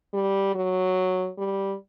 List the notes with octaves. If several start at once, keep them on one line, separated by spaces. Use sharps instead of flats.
G3
F#3
G3